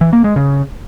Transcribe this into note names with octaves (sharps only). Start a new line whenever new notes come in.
E3
A#3
G#3
C#3